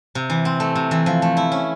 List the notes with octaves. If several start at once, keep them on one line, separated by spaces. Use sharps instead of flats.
C3
E3
C4
A3
C3
E3
F3
A3
E4
C#4